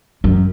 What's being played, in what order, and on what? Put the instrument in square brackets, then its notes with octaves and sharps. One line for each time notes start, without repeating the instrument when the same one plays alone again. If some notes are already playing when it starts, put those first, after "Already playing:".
[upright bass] F#2